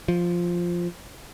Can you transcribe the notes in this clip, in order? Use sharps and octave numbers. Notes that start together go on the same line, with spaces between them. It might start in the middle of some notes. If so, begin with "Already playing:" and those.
F3